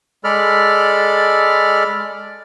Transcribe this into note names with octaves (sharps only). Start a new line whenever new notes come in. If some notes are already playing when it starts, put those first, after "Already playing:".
G#3 A4 D5 B5 F6